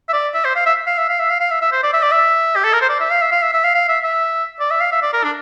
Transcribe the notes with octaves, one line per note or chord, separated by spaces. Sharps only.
E5
D5
E5
C5
F5
E5
F5
E5
F5
E5
F5
F5
E5
E5
C5
D5
E5
D5
E5
G4
A4
A#4
C5
D5
E5
F5
E5
F5
E5
E5
F5
F5
E5
E5
D5
E5
F5
E5
D5
A#4
D4